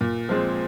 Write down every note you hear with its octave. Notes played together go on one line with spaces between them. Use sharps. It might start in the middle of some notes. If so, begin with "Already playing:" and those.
A#2
F3 G#3 C4